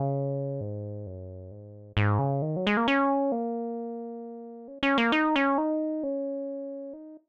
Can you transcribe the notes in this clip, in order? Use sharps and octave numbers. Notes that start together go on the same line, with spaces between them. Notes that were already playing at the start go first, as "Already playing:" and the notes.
Already playing: C#3
G#2
F#2
G#2
G#2
C#3
D#3
F#3
G#3
A#3
C#4
A#3
C#4
C#4
A#3
D#4
C#4
D#4
C#4
D#4